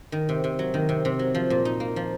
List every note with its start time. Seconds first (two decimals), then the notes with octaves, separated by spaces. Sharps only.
0.12 D#3
0.29 C3
0.44 C3
0.59 F#3
0.74 D#3
0.89 C3
1.05 C3
1.19 F#3
1.35 F3
1.50 A#2
1.65 D#4
1.80 A#3
1.96 F3